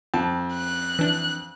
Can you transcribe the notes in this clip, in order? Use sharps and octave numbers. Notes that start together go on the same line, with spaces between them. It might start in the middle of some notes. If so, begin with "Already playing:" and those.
F2 A5
F#6
E3 D4